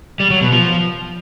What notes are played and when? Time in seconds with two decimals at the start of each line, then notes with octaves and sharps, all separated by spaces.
0.20 G3
0.30 F#3
0.41 B2
0.52 F3